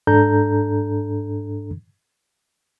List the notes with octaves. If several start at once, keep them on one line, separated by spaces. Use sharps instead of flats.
G#2 D4 A4 A#5 G6